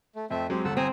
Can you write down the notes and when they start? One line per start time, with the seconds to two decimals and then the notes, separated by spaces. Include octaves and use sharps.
0.16 A3
0.30 F2 A3 C4 E5
0.50 F#3 G#3 C4 G4
0.65 G1 A4 F#5 E6
0.77 C4 G#5 A#5 D#6